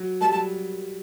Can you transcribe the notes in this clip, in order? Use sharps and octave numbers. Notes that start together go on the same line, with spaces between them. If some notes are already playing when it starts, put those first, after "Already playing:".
Already playing: F#3
G3 A5
F#3 A5